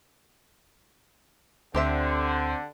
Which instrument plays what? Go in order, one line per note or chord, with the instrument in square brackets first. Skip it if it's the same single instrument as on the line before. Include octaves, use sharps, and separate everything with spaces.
[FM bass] D2 [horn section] D3 [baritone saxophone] C4 [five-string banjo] G4 C5 E5